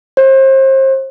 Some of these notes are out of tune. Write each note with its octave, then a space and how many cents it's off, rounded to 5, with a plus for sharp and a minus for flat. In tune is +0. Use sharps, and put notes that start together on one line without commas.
C5 +35